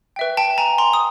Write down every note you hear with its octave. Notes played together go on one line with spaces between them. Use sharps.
B4 E5 G5
G5 A5
G#5 A#5
A#5 C6
D#6